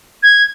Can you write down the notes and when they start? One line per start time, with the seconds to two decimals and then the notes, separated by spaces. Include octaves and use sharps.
0.23 G#6